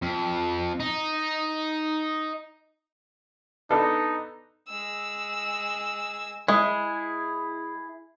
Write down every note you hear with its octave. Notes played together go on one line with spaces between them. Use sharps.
F2
D#4
B3 D4 D#4 A4
G#3 E6
G#3 E4 G#4